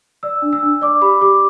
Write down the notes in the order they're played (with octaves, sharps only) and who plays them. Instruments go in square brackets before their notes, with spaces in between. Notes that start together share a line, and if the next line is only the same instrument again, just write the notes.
[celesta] D5 E6
D4
E6
D4
D5 D6
G4 B5
G4 D6